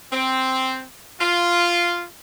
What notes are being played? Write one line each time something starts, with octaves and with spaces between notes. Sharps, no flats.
C4
F4